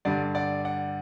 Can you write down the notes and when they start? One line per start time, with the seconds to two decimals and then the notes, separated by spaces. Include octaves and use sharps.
0.05 G2 D3 G3 D5 F#5
0.35 D5 F#5
0.65 D5 F#5